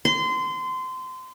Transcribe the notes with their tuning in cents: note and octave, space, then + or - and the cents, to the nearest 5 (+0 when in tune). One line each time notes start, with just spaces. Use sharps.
C6 -25